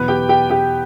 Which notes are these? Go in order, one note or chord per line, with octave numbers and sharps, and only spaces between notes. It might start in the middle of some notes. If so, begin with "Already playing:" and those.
Already playing: E2 B2 F#3 B3 B4
G4 G5
G4 G5
G4 G5